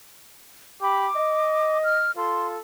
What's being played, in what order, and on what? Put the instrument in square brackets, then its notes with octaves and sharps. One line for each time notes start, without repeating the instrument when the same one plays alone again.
[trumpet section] G4 B5 [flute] D6
[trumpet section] D#5
[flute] F6
[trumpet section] F4 A4 [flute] C6